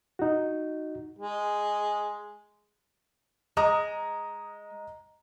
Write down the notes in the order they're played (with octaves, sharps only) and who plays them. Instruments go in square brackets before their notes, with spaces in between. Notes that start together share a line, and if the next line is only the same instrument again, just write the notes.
[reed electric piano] D#4 F#4
[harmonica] G#3
[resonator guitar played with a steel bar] G#3 [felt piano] D#5 A#5 D#6